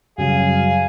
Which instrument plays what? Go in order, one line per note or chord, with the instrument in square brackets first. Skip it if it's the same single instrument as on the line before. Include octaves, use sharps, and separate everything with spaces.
[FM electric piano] F#2 C#3 G3 [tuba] F#3 [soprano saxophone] G#4 [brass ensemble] F5